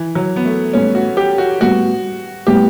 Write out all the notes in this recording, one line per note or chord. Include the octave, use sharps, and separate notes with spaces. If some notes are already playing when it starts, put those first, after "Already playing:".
Already playing: E3
F#3
B3
A3
A2 G3 B3 C#4
F#4
G4
F#4
A2 G3 B3 F#4
A2 G3 B3 G4